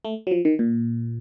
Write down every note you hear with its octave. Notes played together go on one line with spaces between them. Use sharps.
A3
F#3
F3
D#3
A#2